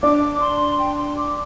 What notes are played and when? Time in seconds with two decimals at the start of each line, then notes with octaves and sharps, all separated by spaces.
0.03 D4 D6
0.41 C6
0.79 G5
0.97 C6
1.16 D6